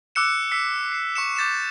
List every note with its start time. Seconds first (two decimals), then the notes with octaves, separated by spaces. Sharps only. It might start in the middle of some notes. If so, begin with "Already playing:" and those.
0.15 D6 E6 F#6 C#7 E7
0.51 E6 B6 C7
0.92 C7 C#7 E7
1.16 C#6 E6 C#7 E7
1.36 D6 G6 A6 B6 E7